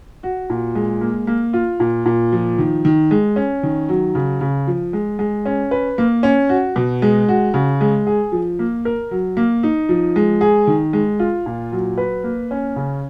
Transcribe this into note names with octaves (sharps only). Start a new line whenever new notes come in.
F#4
A#2
G#3
A#3
A#3
F4
A#2
A#2
F3
D#3
D#3
G#3
C#4
D#3
F#3
C#3
C#3
F3
G#3
G#3
C#4
B4
A#3
C#4
F#4
B2
G#3
F#4
C#3
G#3
G#4
F3
A#3
A#4
F#3
A#3
D#4
F3
G#3
G#4
D#3
G#3
F4
A#2
F#3
B4
A#3
C#4
C#3